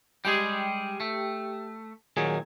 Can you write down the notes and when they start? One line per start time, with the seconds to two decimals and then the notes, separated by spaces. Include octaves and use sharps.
0.25 G3 G#3 G4 G#4 G5
1.00 A3
2.17 A#2 D#3 F#3 G#4 G#6